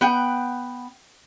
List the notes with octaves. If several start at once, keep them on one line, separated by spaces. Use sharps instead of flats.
B3 F#5 G5